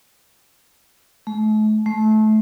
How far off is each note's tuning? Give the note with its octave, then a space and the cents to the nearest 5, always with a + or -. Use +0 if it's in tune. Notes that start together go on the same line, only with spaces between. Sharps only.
A3 -40
A3 -25